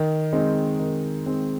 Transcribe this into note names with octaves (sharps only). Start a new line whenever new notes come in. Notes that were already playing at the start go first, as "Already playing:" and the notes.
Already playing: D#3
G#3 C4 D#4
D#3
G#3 C4 D#4